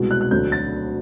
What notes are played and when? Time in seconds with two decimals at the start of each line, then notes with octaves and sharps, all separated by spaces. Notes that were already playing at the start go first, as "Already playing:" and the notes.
Already playing: C2 B2 G#3
0.11 F#6
0.21 F#6
0.31 D2 D3 F#3 A3 G6
0.52 A6